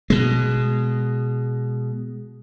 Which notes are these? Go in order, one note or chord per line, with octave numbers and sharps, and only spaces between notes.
B2 G#3